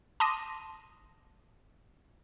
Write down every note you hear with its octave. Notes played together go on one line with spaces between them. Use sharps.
A5 C6 D6 D#6 A#6 D#7